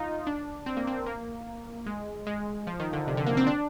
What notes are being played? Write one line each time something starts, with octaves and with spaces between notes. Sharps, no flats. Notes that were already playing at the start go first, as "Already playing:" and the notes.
Already playing: D#4 F4
D4
C4
A#3
C4
A#3
G#3
G#3
F3
D#3
D3
C3
D3
A#3
C4
D4